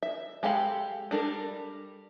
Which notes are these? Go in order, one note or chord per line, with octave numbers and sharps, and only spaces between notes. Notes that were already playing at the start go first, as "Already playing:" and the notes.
E5
G#3 G4 A4 F5 B5
G3 D4 A4 A#4